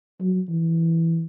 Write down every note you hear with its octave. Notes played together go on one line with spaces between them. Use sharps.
F#3
E3